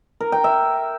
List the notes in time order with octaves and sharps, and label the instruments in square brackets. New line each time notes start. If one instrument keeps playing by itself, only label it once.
[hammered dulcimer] A#4
G5
E5